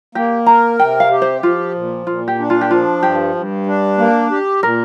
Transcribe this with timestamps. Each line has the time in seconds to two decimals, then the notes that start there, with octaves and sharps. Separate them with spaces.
0.15 A#3 G4
0.46 A#4 A#5
0.79 C3 G5
1.00 F5
1.11 G4
1.22 C5
1.43 F3 F4
1.75 A#2
2.06 A#2 F4
2.28 G4
2.39 D4
2.50 F4
2.61 G4
2.70 F3 F4
3.02 G2 G4
3.35 G2
3.66 D4
3.98 A#3
4.31 G4
4.62 A#2 A#4